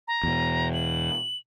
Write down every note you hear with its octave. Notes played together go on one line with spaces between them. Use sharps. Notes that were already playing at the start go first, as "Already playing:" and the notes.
A#5
E2 B2
F#7